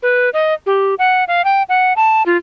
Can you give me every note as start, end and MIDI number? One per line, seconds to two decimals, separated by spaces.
0.02 0.29 71
0.33 0.54 75
0.66 0.95 67
0.99 1.24 78
1.28 1.44 77
1.44 1.63 79
1.69 1.93 78
1.96 2.23 81
2.26 2.37 65